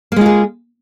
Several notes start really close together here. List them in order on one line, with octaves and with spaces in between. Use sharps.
A#3 G#3 F4 G#4